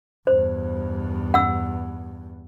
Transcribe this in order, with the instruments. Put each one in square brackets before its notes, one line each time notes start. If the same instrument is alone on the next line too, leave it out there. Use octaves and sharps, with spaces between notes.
[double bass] E2 G2 [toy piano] C5
[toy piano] F#5 E6